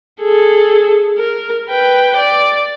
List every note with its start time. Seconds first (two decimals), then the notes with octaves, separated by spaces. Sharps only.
0.21 G#4 A4
1.18 A#4
1.70 B4 G5
2.16 D5